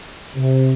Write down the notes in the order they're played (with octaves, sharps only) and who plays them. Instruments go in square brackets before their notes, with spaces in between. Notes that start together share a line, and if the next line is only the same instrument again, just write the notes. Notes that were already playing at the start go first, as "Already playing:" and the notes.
[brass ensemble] C3